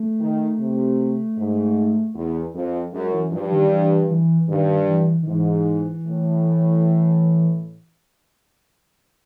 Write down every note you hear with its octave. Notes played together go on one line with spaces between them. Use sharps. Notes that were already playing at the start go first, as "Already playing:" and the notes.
Already playing: A3
D#3
C3
G#2
E2
F2
F#2 G#3
E3
G2 F3
D#3
E3
E3
G2 D#3
E3
D#3
G#2 E3
A2